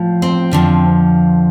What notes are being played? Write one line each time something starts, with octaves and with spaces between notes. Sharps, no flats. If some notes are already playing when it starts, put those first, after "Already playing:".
Already playing: A2 F3
C4
F2 D3 F3